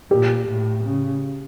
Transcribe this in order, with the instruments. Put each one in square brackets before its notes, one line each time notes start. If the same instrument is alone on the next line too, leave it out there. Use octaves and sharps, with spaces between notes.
[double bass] A#2 [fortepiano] G4
[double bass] A2
C#3